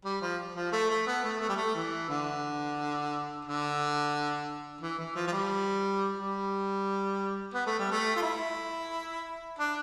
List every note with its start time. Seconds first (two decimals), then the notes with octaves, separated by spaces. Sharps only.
0.05 G3
0.22 F3
0.56 F3
0.72 A3
0.90 A3
1.07 B3
1.24 A3
1.40 A3
1.49 G3
1.56 A3
1.75 E3
2.09 D3
3.45 D3
4.81 E3
4.98 E3
5.16 F3
5.27 F3
5.32 G3
6.18 G3
7.54 B3
7.66 A3
7.79 G3
7.91 A3
8.16 F4
8.22 E4
9.59 D4